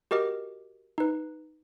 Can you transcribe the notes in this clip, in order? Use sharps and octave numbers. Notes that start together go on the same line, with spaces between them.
F#4 G4 A#4 D#5 D6
D#4 B4